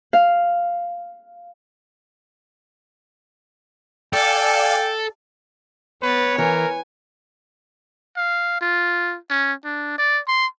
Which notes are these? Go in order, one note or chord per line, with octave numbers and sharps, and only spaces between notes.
F5
A4 D5 F5 G5 G#5
B3 B4 C#5 A6
E3 A#4 G#5
F5
F4
C#4
D4
D5
C6